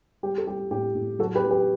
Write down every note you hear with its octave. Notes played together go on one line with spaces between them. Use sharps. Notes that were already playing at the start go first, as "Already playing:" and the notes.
G3 G4
A4
G3 G4
A2 G4
A2
F#3 F#4 A4
G4 B4
F#3
G4 B4